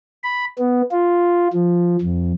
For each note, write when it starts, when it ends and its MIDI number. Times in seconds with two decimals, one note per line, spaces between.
0.24 0.45 83
0.58 0.82 59
0.91 1.48 65
1.53 1.97 53
2.01 2.32 41